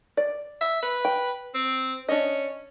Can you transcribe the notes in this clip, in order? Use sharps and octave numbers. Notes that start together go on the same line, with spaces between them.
D5
E5
B4
G5
C4
C#4 D4 D#5